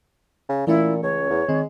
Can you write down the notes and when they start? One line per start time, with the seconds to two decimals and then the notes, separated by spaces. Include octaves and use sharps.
0.49 C#3
0.67 A#2 E3 A3 C#4 E4
1.03 C#2 C#5
1.30 E2
1.49 D#3 G#3 C4